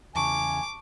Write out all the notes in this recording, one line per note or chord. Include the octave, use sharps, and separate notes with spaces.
E2 C#3 G#5 A5 C#6 D6